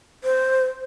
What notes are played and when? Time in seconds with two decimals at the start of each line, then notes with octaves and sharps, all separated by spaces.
0.24 C5